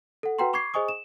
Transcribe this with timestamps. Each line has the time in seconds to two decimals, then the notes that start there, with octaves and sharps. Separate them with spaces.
0.23 A4 F#5
0.39 F#4 B4 F#5 G5 A#5 C6
0.53 B5 C#6 D6 G#6 C7
0.74 G#4 C5 D#5 G#5 C#6 D#6
0.88 E7